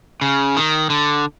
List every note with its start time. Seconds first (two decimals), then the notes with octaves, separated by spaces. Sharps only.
0.21 C#3
0.57 D#3
0.90 D3